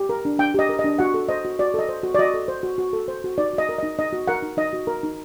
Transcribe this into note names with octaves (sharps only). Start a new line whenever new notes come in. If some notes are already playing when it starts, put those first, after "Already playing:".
Already playing: G4
A#4
D4
D4 G5
G4 D#5
A#4
D#5
D4
F#4 F#5
A4
C5 D#5
F#4
F#4 D5
A4 D#5
C5
F#4
D5
F#4 D#5
A4
C5
F#4
F#4
A4
C5
F#4
D#4 D5
F#4 D#5
A#4
D#4 D#5
D#4 D#5
F#4
A#4 F#5
D#4
D#4 D#5
F#4
A#4
D#4